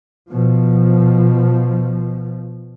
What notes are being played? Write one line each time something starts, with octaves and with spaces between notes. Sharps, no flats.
B2 F3